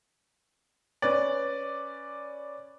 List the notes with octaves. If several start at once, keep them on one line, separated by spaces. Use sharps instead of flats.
C#4 B4 D5